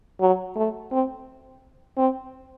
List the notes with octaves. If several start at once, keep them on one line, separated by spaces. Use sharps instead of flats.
F#3
A3
C4
C4